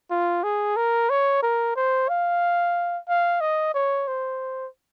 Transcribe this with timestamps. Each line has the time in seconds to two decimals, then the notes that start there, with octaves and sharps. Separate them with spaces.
0.11 F4
0.44 G#4
0.77 A#4
1.10 C#5
1.43 A#4
1.76 C5
2.09 F5
3.09 F5
3.41 D#5
3.75 C#5
4.08 C5